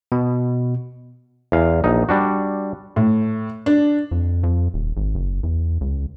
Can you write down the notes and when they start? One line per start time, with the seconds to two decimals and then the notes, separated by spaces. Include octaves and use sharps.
0.12 B2
1.52 E2 F5
1.84 A#1 D#4
2.09 G3 D4 F#4
2.96 A2
3.66 D4
4.11 F2
4.44 F2
4.74 D#1
4.97 G#1
5.15 F#1
5.43 E2
5.81 C#2